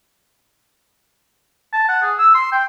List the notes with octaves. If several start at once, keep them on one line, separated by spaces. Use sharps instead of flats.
A5
F#5
G#4
E6
C6
G5